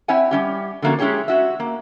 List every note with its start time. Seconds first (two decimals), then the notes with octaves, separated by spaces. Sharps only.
0.08 C4 E4 C#5 E5 F#5 G#5
0.31 G3 C#4 G4
0.82 D3 F3 A3 A#3 C#4 F#4
0.99 G#3 C#4 E4 G4 G#4 C#5
1.28 C#4 F#4 E5
1.60 A#3